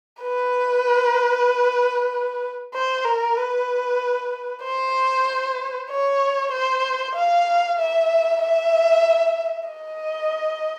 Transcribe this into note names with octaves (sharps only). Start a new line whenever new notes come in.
B4
C5
A#4
B4
C5
C#5
C5
F5
E5
E5
D#5